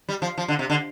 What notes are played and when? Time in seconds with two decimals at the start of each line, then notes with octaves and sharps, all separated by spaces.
0.09 G3
0.22 F3
0.38 F3
0.48 D3
0.59 C3
0.70 D3